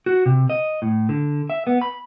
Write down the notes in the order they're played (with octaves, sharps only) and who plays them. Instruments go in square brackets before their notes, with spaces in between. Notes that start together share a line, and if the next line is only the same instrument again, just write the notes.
[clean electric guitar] F#4
C3
D#5
A2
D3
E5
B3
B5